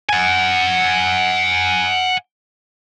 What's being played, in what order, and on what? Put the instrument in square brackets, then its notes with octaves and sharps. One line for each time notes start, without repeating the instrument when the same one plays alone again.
[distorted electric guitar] F#5 G#5